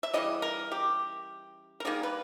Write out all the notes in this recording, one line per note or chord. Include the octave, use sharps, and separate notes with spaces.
E5
C#3 E3 G3 D#5
A#4
G4
A#4
D#3 G3 A#3 G#4
B4